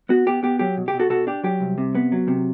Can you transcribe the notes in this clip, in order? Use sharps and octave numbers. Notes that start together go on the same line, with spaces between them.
B3 F#4
B3 G4
B3 G4
F#3 G4
B2
G4
B2
F#4 A4
B2 F#4 A4
D4 G4
F#3 G4
C2
C3
B3
F#3
C3